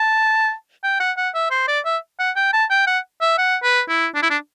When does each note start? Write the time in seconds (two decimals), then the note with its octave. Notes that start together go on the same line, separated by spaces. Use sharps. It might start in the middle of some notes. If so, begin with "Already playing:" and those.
Already playing: A5
0.84 G5
1.00 F#5
1.17 F#5
1.34 E5
1.51 C5
1.68 D5
1.85 E5
2.19 F#5
2.36 G5
2.53 A5
2.70 G5
2.87 F#5
3.21 E5
3.38 F#5
3.63 B4
3.89 E4
4.15 D4
4.23 E4
4.30 D4